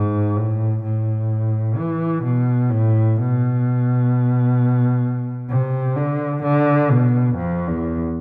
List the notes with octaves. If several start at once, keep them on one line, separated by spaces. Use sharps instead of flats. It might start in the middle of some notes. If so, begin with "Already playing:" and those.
Already playing: G#2
A2
A2
E3
B2
A2
B2
C3
D3
D3
B2
F2
E2